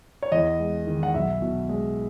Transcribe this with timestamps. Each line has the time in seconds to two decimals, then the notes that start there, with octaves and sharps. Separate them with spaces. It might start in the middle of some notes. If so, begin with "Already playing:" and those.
0.22 C#5
0.32 E2 D#5
0.60 G#3
0.87 D#3
1.03 F#5
1.14 B1 E5
1.42 B2
1.69 G#3